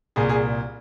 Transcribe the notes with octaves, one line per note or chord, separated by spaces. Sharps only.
C2 A#2 G#4
G#4